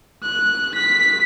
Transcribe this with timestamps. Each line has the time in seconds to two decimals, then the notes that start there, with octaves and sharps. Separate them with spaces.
0.23 F#6
0.74 B6